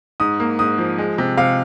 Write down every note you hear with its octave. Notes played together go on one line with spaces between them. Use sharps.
G#2 D#6
A#3
G#2 D#6
F3
G#3
C3
C3 F5